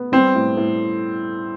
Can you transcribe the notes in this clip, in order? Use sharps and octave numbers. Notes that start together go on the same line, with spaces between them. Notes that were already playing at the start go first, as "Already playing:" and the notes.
Already playing: B3
G3 C4
A2
A2